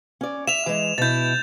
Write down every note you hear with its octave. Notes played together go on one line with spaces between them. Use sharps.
C#4 D5
E5 E7 F7
E3 G#3
B2 E4 G6 A6